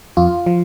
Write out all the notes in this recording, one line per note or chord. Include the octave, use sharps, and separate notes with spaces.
F2 F4
F3